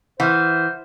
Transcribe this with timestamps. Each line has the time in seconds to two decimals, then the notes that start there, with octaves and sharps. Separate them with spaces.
0.20 E3 C5 F#5 F6